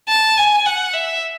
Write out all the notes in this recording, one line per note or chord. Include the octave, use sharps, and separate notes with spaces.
A5
G#5
F#5
E5